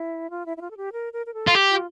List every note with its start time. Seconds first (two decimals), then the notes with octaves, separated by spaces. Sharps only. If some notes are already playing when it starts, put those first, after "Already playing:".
Already playing: E4
0.30 F4
0.46 E4
0.57 E4
0.61 F4
0.71 A4
0.77 G4
0.93 A#4
1.13 A#4
1.26 A#4
1.34 A4
1.47 F4
1.55 G4
1.70 F4